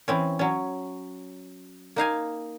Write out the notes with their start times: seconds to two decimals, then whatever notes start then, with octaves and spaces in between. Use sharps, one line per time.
0.08 E3 C4 C#4
0.39 F#3 C#4
1.96 A#3 D#4 F5 G#5